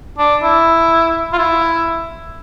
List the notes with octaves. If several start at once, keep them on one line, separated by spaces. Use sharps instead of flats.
D4
E4
F4
E4